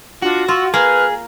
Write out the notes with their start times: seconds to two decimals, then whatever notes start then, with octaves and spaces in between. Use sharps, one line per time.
0.22 D4 F4 F#4
0.48 F4 C#6 E6
0.74 A#3 G#4 B4 F6